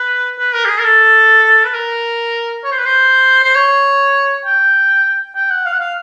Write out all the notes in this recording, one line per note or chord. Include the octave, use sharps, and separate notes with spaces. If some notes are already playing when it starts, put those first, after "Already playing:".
Already playing: B4
B4
A#4
G4
G#4
A#4
A4
B4
A#4
C#5
C5
B4
C5
C5
C#5
G5
G5
F#5
F5
F#5
F5